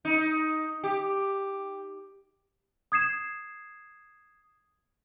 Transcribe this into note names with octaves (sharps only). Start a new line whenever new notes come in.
D#4
G4
D#6 G#6 C7 E7